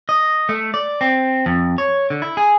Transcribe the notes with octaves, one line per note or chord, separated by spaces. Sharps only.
D#5
A3
D5
C4
F2
C#5
D3
E4
G#4